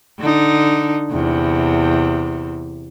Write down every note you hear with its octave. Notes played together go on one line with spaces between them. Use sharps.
D3 D#4
E2 C3